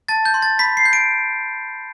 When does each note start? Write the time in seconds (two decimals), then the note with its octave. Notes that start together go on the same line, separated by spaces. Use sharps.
0.08 A5 A6
0.25 G6
0.34 C6
0.42 A6
0.59 B5 B6
0.77 C7
0.85 G6
0.93 D7